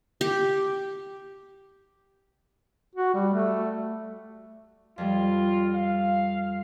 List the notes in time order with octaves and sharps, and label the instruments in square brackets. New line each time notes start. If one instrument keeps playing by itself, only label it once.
[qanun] G4
[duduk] F#4
G3
A3
[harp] F2 G3 [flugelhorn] F4
[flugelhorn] F5